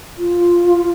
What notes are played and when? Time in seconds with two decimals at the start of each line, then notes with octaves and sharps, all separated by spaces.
0.17 F4